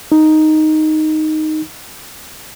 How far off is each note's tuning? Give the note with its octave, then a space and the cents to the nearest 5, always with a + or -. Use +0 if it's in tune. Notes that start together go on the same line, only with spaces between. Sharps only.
D#4 +0